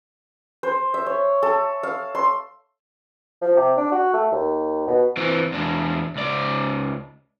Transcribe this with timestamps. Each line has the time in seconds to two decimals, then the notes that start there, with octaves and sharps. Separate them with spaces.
0.63 C5
0.94 E5
1.06 C#5
1.43 A4
1.83 F5
2.15 C6
3.42 F3
3.57 C3
3.77 D4
3.92 F#4
4.14 A3
4.32 D#2
4.87 B2
5.17 E3 C4
5.52 E2 D4
6.16 C#2 D5